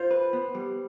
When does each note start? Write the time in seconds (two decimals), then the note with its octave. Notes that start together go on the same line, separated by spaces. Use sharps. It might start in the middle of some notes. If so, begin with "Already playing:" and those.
Already playing: F4 C5
0.11 B4
0.33 B3
0.55 G3